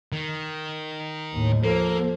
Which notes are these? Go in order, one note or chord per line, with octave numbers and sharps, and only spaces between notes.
D#3
D#2 A2
F3 A#3 A4